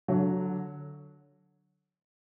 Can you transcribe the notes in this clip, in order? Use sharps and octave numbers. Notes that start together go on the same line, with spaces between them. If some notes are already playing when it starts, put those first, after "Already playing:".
D3 F#3